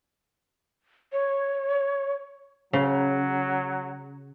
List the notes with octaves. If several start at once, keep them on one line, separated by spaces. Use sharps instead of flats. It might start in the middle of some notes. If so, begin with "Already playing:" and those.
C#5
C#3 F#3